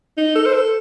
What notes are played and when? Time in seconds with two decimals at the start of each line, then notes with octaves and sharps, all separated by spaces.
0.18 D#4
0.36 A4
0.46 C5
0.54 A4